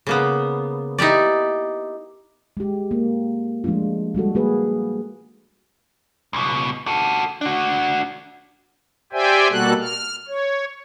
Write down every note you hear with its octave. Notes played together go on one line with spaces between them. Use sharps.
C#3 A#3 B3
D#4 E4 G4 D5
G#3 G4
A#3
F3 G#3 A3 D4 F4
G3 G#3 F#4 A4
A#3 F#4 G#4 B4
C#2 B2
F#4 A4
D4 F#4
G4 C5 D5 E5 G5 G#5
B2 G3 A#3 F#4 A4 F#6
F6
C#5